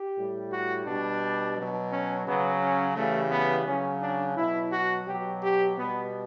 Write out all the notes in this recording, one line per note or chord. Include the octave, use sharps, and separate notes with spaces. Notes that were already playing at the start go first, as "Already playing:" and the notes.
Already playing: G4
A2 G3
F#4
B2 G3 D4
B2 F#3
C#4
C#3 F#3 B3
C#4
C#3 E3 G3 A3
B3
C#3 F#3 C#4
D4
B2 F#3 E4
F#4
B2 F#3 G4
G4
B2 G3 B3